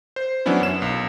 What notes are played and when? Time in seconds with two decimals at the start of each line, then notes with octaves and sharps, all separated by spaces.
0.16 C5
0.46 E3 F#3 B3 C#4 D4 E4
0.61 F#2 E7
0.82 B1